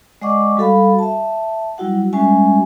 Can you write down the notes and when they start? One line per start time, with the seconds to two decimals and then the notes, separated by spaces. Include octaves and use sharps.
0.22 G#3 D5 D#5 F#5 C#6 D6
0.57 G3 F#4 A4 F5 B5
0.99 E5 A5
1.78 F#3 G3 E4 F#4 F#5
2.13 G3 G#3 C#4 F#4 E5 G#5